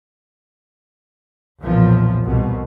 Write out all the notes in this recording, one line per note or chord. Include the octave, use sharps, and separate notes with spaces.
B1 E2 A#2 F3
C2 B2